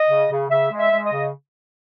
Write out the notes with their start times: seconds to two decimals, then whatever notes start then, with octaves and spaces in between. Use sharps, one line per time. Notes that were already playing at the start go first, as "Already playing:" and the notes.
Already playing: D#5
0.09 C#3
0.30 C#3
0.50 C#3 E5
0.71 G#3
0.78 E5
0.91 G#3
1.06 D#5
1.12 C#3